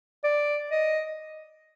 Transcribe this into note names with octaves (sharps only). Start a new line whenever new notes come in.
D5
D#5